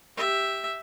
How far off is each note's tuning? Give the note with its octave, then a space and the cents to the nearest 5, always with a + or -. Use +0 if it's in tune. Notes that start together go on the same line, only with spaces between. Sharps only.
G4 +5 E5 +0